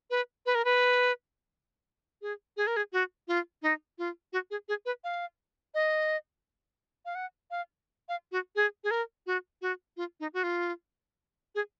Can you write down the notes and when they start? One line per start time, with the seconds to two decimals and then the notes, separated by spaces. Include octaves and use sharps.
0.10 B4
0.46 B4
0.55 A#4
0.65 B4
2.22 G#4
2.57 G#4
2.67 A#4
2.77 G#4
2.93 F#4
3.28 F4
3.62 D#4
3.98 F4
4.33 F#4
4.51 G#4
4.69 G#4
4.86 B4
5.04 F5
5.74 D#5
7.06 F5
7.15 F#5
7.51 F5
8.09 F5
8.32 F#4
8.56 G#4
8.84 G#4
8.91 A#4
9.27 F#4
9.62 F#4
9.97 F4
10.20 D#4
10.34 F#4
10.43 F4
11.55 G#4